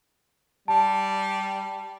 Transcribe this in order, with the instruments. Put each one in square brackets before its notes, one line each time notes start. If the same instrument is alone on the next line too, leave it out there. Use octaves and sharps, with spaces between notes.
[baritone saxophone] G3 [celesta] A5